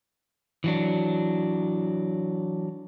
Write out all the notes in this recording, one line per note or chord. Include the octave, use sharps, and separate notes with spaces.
E3 F#3 D4